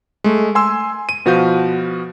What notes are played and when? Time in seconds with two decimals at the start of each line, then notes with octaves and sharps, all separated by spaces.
0.24 G#3 A3
0.55 G#5 C6 E6
1.09 D#7
1.26 B2 F3 F#4 B4 F5 G6